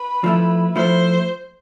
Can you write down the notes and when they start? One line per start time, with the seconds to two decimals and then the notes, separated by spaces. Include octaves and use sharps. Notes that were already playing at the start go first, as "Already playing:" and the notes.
Already playing: B4
0.24 F3 A3 E4
0.76 F3 A3 E4 C5